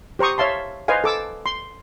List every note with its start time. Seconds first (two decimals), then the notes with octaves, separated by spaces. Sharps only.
0.19 G4 C5 A#5 C#6 D#6
0.38 C#5 E5 F5 A5 C6
0.88 B4 C5 D#5 F5 G#5
1.04 A4 D6 E6
1.46 C6